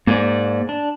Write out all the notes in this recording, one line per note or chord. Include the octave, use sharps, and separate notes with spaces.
G#2 A#3 D5
D4